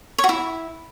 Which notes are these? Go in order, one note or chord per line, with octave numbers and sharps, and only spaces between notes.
C#5
F#4
E4